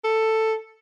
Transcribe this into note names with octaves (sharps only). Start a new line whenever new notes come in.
A4